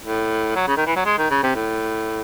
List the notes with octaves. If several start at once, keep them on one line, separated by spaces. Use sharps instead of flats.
A2
F#3
C#3
D#3
E3
F#3
G#3
D#3
C#3
C3
A2